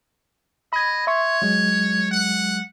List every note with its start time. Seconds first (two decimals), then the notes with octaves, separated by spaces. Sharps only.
0.73 D#5 B5 G#6
1.07 C#5 E5 C6 C#6
1.42 F#3 G#3
2.11 F#5